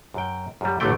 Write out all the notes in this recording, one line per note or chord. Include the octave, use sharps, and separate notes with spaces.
F#2 G5
F#2 G3
A1 F#2 D3 A3 G5